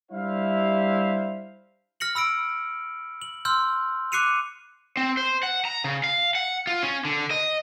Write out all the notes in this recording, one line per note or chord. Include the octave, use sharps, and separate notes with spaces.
G3 D4 E4 C5 E5 F5
F6 A#6 C#7 F#7
B5 E6 A#6 D7
F#7
C6 E6 F6 G6
D6 F#6 C7 C#7 D#7 F7
C4
C5
F#5
A#5
C#3
F5
F#5
F4
C#4
D3
D#5